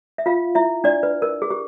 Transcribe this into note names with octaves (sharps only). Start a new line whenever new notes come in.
E5
F4 F5
E4 E5
D4 D5
B4
A#4
G#4
G4